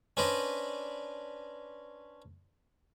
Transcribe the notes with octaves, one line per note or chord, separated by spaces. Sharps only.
C#4 D4 B4 C5 D5 D#5